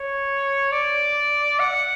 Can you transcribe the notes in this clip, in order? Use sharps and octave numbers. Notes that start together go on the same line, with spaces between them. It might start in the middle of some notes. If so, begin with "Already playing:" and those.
Already playing: C#5
D5
F#5